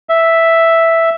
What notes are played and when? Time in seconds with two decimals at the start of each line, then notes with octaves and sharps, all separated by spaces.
0.09 E5